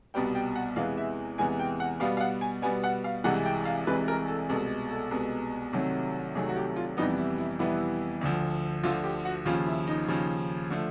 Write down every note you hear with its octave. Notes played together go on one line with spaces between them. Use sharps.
C2 B2 G3 B3 G5
G5
F#5
E2 C3 E3 G#3 B3 F5
E5
E2 C3 E3 G#3 B3 G#5
G5
F#5
B2 G3 B3 F5
F5
F#5
G#5
B2 G3 B3 G#5
F#5
F5
C2 C3 E3 G#3 F#5
G5
F5
C2 C3 E3 G#3 B4
A#4
A4
C2 B2 G#3 A4
A4
C2 B2 G#3
C2 C3 D#3 F#3 A3
C2 C3 D#3 F#3 A3 G#4
F#4
G4
F4
F2 C3 E3 G3 B3 D#4
E4
E4
F2 C3 E3 G3 B3 E4
D2 D3 F3
D2 D3 F3 F4
G4
F#4
D#2 C#3 F3 F4
E4
D#4
D#2 C#3 F3
D3 F3 A3